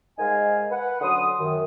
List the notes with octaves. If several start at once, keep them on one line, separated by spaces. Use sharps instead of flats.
G#2 G#3 D#4 A#4 F5 G#5
B4 F#5
D3 F#3 C#4 C6 D#6
F#2 D#3